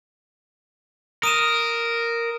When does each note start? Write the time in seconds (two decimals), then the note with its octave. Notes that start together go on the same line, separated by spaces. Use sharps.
1.23 A#4 D#6 D#7 E7